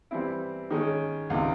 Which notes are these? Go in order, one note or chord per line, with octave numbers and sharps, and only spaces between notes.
E3 G3 C4 E4
D#3 G#3 C#4
C#2 C3 D#3